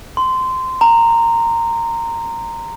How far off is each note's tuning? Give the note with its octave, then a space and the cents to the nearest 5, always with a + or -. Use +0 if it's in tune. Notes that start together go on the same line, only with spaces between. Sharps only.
C6 -15
A#5 -10